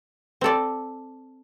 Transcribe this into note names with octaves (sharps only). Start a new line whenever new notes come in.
C4 A4 D5